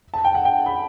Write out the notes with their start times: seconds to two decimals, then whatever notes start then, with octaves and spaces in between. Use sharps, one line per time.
0.14 A5
0.24 G5
0.35 F#5
0.45 G5
0.66 B5